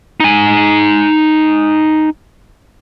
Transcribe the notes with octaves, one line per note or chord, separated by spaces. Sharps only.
D#4 G#5